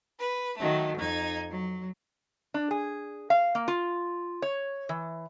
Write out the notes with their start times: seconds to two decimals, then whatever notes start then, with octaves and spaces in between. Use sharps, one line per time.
0.20 B4
0.58 D#3 F#3 A3
0.98 F2 D#4 G#6
1.50 F#3
2.54 D4
2.71 G#4
3.30 F5
3.55 A#3
3.68 F4
4.42 C#5
4.89 E3